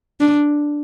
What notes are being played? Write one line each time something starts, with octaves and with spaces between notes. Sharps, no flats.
D4